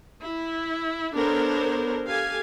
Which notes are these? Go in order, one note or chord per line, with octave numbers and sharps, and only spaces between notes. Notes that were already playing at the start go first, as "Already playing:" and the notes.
E4
B3 D4 A4 A#4 C5 C#5
G4 A4 F5 G#5